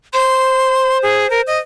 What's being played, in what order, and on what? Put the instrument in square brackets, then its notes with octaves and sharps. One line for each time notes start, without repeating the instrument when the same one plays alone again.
[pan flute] C5 [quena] C6
[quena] G#4
A#4
D#5